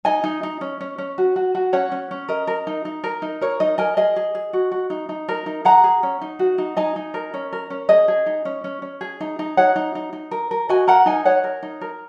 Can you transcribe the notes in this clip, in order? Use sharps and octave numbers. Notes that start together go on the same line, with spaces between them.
D#4 D#5 G#5
D#4
D#4
C#4
C#4
C#4
F#4
F#4
F#4
C#4 C#5 F#5
C#4
C#4
A#4 D#5
A#4
D#4
D#4
A#4
D#4
A#4 C#5
D#4 D#5
A#4 D#5 G#5
G#4 D#5 G#5
G#4
G#4
F#4
F#4
D#4
D#4
A#4
D#4
G#4 F#5 A#5
G#4
C#4
D#4
F#4
D#4
D#4 D#5 G#5
D#4
A#4
C#4
A#4
C#4
G#4 D#5
G#4
D#4
C#4
C#4
C#4
G#4
D#4
D#4
D#4 C#5 F#5
D#4
D#4
D#4
A#4
A#4
F#4 D#5 G#5
A#4 F#5 A#5
D#4 D#5 G#5
D#4 C#5 F#5
A#4
D#4
A#4